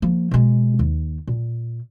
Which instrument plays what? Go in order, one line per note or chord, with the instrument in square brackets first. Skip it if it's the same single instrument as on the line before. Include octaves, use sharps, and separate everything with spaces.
[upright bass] F3 A#3
B2 G#3
D#2
A#2